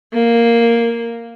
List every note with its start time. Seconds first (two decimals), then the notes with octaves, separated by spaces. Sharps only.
0.14 A#3